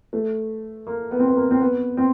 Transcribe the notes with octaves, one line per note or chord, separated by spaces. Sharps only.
A3
A#3
B3
C4
B3
A#3
C4
B3
C4